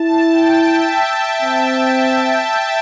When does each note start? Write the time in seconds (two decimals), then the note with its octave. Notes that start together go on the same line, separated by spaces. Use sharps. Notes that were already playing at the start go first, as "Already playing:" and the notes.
Already playing: E4 A5
0.31 G5
0.68 E5
1.42 C4